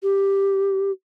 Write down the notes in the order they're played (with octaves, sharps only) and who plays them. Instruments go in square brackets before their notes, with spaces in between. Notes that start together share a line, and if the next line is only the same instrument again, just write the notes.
[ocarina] G4